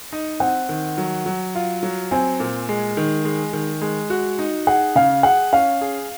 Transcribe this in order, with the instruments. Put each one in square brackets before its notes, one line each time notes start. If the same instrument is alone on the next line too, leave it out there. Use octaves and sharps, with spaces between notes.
[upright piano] D#4
[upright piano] C4 [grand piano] F#5
[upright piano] D#3
F#3
F#3
F4
F#3
[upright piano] C4 [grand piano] G#5
[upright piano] A#2
G#3
D#3
G#3
D#3
G#3
F#4
D#4
[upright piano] G#4 [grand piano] F#5
[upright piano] C#3 [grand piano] F5
[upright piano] G#4 [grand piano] F#5
[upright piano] C#4 [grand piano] F5
[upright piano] G#4